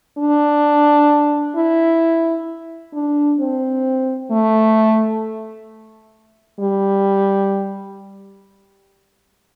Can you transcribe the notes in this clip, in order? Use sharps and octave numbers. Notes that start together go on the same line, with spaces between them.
D4
E4
D4
C4
A3
G3